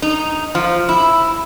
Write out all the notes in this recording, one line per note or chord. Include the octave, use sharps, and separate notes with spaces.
D#4
F3
E4